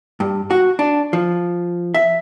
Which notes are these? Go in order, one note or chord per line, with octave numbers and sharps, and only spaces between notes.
G2
F#4
D4
F3
E5